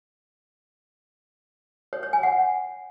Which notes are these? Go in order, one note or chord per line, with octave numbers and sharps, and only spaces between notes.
C#5
C#5
G#5
F#5